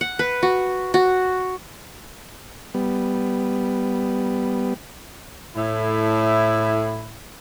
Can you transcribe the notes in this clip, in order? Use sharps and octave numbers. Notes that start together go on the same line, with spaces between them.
F#5
B4
F#4
F#4
G3 B3
A2 E4